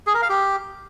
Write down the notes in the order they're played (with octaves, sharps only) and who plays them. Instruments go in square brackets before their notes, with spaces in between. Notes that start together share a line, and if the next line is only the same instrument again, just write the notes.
[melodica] G#4
A#4
F5
G4